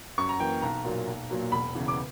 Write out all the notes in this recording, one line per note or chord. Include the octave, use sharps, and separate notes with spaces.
F#2 C#6
A#5
E3 A#3 G5
B1 A#5
A#2 F#3 A#3
B1
A#2 F#3 A#3
E1 B5
E2 C#3 E3
D6